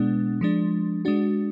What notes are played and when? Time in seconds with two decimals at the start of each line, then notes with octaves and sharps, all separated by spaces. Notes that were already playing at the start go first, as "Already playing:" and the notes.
Already playing: B2 G#3 B3 D4
0.41 F3 G#3 D4
1.05 G#3 D4 F#4